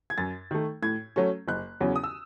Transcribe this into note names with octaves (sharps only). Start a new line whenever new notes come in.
G#6
F#2 A6
D#3 A3
A2 G#6
F#3 A3 C#4
F#1 F#6
E2 C#3 F#3 C#4
D#6
E6